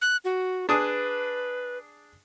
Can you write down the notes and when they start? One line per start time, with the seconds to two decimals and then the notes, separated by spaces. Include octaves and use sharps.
0.02 F#6
0.25 F#4
0.69 D4 G#4 B4 D#6